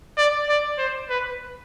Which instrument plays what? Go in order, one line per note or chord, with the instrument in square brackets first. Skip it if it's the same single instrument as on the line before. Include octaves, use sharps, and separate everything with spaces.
[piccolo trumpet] D5
D5
C5
B4